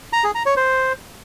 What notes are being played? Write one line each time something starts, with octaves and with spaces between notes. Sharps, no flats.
A#5
G#4
A#5
C#5
C5